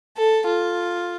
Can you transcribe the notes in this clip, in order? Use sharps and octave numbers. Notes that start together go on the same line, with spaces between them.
A4
F4